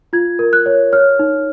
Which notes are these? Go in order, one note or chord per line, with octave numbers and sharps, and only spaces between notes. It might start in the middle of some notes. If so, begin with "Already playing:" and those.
F4 G#6
A#4
F#6
C#5
C#5 F6
D#4